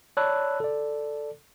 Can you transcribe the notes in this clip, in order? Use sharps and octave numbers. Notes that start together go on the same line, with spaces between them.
C#5 D5 A5 B5 E6 F#6
A4 D5